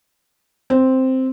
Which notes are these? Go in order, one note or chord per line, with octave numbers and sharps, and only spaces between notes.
C4